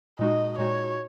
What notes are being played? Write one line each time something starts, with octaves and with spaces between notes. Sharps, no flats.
A#2 G#3 D#4 F#4 D#5
A#2 G#3 D#4 F#4 C#5